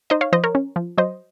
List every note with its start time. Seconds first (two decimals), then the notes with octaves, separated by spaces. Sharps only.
0.10 D#4 C5 D#5
0.21 C#5 F5
0.33 F3 C5 D#5
0.44 A#4 C#5
0.55 C#4
0.76 F3
0.98 F#3 C5 D#5